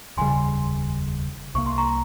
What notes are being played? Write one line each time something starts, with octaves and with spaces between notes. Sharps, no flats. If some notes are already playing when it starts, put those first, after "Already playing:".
F1 D#2 C#3 G3 G#5 C6
C2 C3 G3 A#3 C#6
C6
A#5 C#6